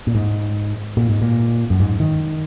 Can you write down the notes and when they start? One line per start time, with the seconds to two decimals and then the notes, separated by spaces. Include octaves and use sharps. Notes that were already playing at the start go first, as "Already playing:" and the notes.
0.07 A#2
0.15 G#2
0.97 A#2
1.09 G#2
1.22 A#2
1.70 F#2
1.80 G#2
2.00 D#3